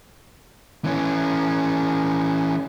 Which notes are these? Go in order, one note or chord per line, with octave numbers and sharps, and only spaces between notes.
E3 C#4